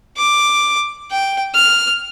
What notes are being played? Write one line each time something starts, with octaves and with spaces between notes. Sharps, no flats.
D6
G5
F6